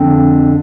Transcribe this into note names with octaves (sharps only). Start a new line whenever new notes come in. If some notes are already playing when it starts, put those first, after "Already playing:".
Already playing: F2 D3 C4